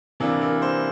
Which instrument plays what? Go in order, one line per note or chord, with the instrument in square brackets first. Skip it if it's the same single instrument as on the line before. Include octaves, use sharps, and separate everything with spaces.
[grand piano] C3 E3 A#3 D4 A#4
A#4
C5